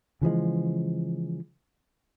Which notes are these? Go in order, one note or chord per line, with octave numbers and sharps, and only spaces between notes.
C#3 E3 F3 G#3